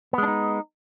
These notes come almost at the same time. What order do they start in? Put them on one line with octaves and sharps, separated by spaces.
B3 G#3 D4 D#4